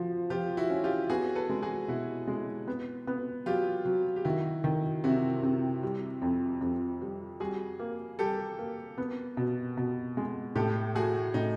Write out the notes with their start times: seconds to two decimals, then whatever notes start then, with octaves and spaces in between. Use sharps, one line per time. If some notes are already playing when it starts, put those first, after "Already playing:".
Already playing: F3 F#4
0.30 F3 F4 G4
0.57 E4 F#4
0.70 C#4
0.84 F4 G4
1.09 B3 F#4 G#4
1.35 A4 B4
1.50 G#3
1.62 F#4 G#4
1.88 B2 E4 F#4
2.28 G#3
2.67 B3
3.07 B3
3.46 F#3 F4 G4
3.85 F#3
4.16 G4
4.25 D#3 E4 F#4
4.64 D#3
5.04 C3 E4 F#4
5.43 C3
5.83 G3
6.22 F2
6.61 F2
7.02 G3
7.40 G3 F#4 G#4
7.79 A#3
8.19 G3 G4 A4
8.59 A#3
8.98 B3
9.37 B2
9.77 B2
10.17 G#3
10.55 A2 G4 A4
10.95 A3 F#4 G#4
11.34 A2 D#4